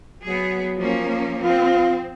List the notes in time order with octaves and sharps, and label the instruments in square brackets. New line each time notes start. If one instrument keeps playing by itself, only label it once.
[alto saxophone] F#3 [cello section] B3 G#4
[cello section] F3 A#3 C#4
[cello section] F3 C4 [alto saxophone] F4